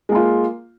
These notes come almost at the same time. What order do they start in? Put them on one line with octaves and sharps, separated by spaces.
G#3 A#3 F4